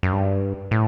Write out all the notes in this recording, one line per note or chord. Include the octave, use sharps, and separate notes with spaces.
F#2
G2
A2